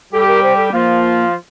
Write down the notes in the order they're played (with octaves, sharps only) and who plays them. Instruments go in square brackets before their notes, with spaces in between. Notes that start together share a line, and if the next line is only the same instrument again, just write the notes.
[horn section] G3 G4 [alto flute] A4
[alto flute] A#4
C5
A4
[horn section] F3 F4 [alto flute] A#3